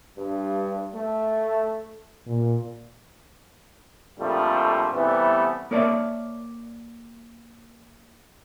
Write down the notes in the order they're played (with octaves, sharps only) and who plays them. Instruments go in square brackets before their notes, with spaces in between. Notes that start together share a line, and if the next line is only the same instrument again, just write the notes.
[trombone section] G2
A3
[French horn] A#2
[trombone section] A#1 F2 F3 G3 A3
C3 E3 G3 A3 B3
[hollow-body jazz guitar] A#3 A#4 C#5 D5 E5 A5